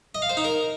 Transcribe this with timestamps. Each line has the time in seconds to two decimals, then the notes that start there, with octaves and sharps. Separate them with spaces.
0.15 D#5
0.22 F5
0.30 C5
0.37 D#4
0.44 A#4